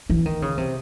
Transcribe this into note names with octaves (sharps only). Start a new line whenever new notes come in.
E3
D#3
C#3
C3